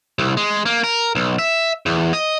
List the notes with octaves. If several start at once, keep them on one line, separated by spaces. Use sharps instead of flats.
C2
G#3
A#3
A#4
B1
E5
E2
D#5